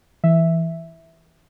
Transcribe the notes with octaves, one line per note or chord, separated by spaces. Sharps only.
E3 E5